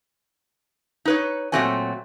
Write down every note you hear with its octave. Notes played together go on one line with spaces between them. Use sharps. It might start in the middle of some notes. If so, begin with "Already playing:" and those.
D#4 B4 C#5
A#2 F#3 A3 C4 F#4 G#5